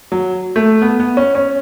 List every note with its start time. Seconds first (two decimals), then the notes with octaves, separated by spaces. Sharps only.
0.12 F#3
0.56 A3
0.82 B3
1.00 B3
1.17 C#4
1.35 C#4